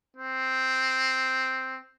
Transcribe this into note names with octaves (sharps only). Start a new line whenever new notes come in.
C4